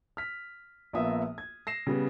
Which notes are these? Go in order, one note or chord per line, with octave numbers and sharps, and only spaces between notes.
F6 B6
A#1 A#3 B3 F4 E5 D#6
G#6
A#6 C7 E7
C#3 G3 B3